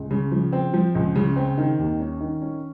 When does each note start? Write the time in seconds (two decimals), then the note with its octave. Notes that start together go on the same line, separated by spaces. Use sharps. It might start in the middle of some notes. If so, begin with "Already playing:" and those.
Already playing: C#2
0.11 C#3
0.32 F3
0.53 C4
0.74 F3
0.95 C#2
1.15 C#3
1.36 C4
1.58 D#3
1.79 D#2
2.00 C#4
2.21 D#3
2.42 C#4